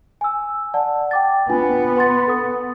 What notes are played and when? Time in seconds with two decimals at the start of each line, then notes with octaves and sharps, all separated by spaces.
0.21 G#5 E6
0.74 D5 F#5 A5
1.11 G5 D6 A6
1.49 B3 D4 F4 G#5
1.96 B4 C6 A6
2.27 A4 D#6